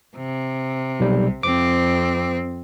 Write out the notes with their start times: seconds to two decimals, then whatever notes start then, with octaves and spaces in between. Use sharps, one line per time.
0.17 C3
1.00 B1 G3
1.43 F2 C4 D6